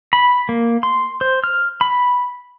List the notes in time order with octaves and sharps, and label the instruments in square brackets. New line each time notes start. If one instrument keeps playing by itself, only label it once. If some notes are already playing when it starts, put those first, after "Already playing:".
[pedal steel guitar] B5
A#3
C6
C5
F6
B5